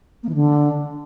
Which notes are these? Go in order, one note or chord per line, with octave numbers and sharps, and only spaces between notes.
A#3
E3
D3